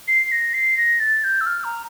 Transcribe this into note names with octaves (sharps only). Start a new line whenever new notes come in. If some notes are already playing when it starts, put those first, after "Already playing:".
C7
A#6
C7
A#6
A6
G6
E6
F6
A#5